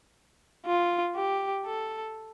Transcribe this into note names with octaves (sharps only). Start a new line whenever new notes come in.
F4
G4
A4